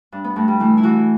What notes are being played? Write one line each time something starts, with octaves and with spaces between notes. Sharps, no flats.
G2 D4
B3
G2 A3
G3
E3 A3
E4
E3 F#4